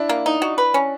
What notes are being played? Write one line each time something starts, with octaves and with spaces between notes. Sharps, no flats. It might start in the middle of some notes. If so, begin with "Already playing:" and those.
Already playing: D4 E4
A#3
D#4
F#4
B4
C#4